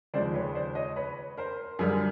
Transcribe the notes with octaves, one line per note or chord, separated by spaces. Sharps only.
D#2 C#3 F3 G#3 C5 D5
B4 C#5
C5 D5
C#5 D#5
B4 C#5
A#4 C5
F#2 D3 G3 G#4 A#4